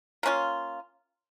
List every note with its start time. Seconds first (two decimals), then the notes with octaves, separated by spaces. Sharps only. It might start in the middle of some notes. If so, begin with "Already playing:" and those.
0.23 A#3 C#4 F4